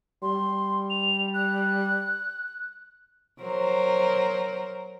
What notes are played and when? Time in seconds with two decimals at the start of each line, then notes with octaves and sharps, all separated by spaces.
0.22 G3 C6
0.90 F7
1.34 F#6
3.42 F#3 A#4 C5